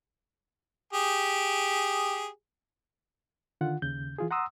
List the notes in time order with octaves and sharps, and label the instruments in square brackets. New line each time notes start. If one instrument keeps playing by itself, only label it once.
[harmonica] G4 G#4
[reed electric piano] D3 D#3 F4 F#5
D#2 C#3 G6
E3 F4 G#4
F#5 A#5 C6 D#6 E6